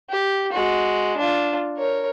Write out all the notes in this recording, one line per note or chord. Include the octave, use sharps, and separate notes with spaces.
G4
G#3 F#4
D4 F4
A#4 C#5